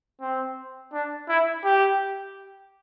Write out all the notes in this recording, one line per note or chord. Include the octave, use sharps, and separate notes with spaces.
C4
D4
E4
G4